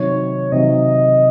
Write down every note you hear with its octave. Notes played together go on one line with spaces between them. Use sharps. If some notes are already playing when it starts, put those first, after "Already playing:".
Already playing: C3 D#3 F#3 C#5
C3 D#3 F#3 D#5